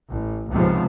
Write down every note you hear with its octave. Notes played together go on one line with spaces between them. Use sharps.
A1
C#2 G#2 C3 F3 B3